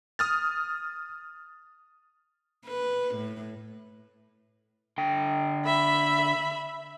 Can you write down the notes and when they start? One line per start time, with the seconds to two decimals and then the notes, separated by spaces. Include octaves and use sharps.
0.19 D#6 F6 A6
2.67 B4
3.15 A2
4.98 D3 G5
5.65 E5 B5